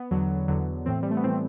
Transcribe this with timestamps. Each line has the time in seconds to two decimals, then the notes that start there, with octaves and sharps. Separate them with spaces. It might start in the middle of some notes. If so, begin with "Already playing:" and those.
Already playing: B3
0.11 E2 D3 F#3
0.48 E2 D3 F#3
0.86 A2 E3 C4
1.03 G3
1.11 A3
1.17 B3
1.24 A2 E3 C4